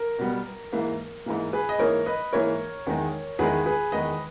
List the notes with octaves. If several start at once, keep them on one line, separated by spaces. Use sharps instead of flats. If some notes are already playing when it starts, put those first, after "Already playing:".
Already playing: A#4
B2 G3 B3
G#2 E3 A#3
G#2 E3 A#3
G#4 B4
D#5
G#2 E3 A#3 A#4 C#5
B4 D#5
G#2 E3 A#3 A#4 C#5
E2 D#3 G#3 D#4
E2 D#3 G#3 D#4 G#4 B4
G#4 B4
E2 D#3 G#3 D#4 B4 D#5